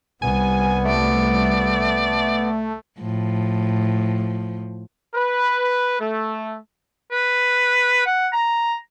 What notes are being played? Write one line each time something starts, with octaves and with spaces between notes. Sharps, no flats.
C2 G3 B3 G#5
A3 D5
A2 F3
B4
A3
B4
F#5
A#5